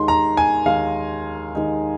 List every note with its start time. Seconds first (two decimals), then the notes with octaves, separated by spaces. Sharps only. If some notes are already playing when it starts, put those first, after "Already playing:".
Already playing: D#2 D#3 G#3 D#4 C6
0.08 A#5
0.37 G#5
0.66 D#2 D#3 G#3 D#4 F5
1.55 D#2 D#3 G#3 D#4